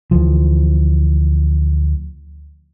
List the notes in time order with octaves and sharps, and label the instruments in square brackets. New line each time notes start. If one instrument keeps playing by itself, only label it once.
[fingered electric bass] D2 E3 F3